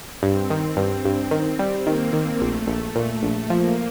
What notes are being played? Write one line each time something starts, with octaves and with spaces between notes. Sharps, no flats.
G2 C4
D#3
G2 C4
G2
D#3
G3
D#3 A#3
D#3
A#1 A3
A#1
A#2
A#1
F3 A#3